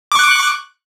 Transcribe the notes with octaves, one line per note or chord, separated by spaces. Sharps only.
C#6 D6 F#6